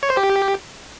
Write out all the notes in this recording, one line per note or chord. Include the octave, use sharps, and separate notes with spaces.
C#5
C5
G4